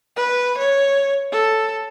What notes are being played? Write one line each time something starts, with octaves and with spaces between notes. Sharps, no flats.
B4
C#5
A4